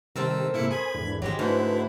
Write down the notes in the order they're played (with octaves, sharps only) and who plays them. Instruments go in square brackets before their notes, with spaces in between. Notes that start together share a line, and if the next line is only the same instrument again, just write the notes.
[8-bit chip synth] C3 E6 [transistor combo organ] D#3 G3 [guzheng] C4 A4 A#4
[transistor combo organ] G#2 C3 E6 [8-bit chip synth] A#3 E4 C#7
[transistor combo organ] C5 G#5 D#6 [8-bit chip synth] B5 G#6
[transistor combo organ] E2 G#2 D3
[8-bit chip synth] G#1 G4 [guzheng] F#3 G#3
[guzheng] G#2 [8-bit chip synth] D3 E4 [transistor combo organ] A3 F#4 B4